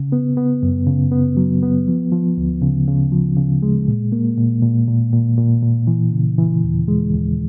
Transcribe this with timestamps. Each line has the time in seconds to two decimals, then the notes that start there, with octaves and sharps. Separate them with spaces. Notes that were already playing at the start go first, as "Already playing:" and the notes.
Already playing: C#3
0.12 B3
0.37 B3
0.63 F#2
0.87 C#3
1.12 B3
1.37 F#3
1.62 B3
1.87 F3
2.12 F3
2.38 D2
2.62 C#3
2.88 C#3
3.12 F3
3.37 C#3
3.63 G#3
3.88 A#2
4.12 A#3
4.37 A#2
4.62 A#2
4.88 A#2
5.13 A#2
5.37 A#2
5.62 A#2
5.87 E3
6.13 C#3
6.38 E3
6.64 D#2
6.88 G#3
7.13 D#2